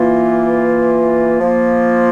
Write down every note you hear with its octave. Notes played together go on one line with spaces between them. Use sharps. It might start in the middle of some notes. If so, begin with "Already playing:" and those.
Already playing: E3 A#3 F4
F3 A#3 F4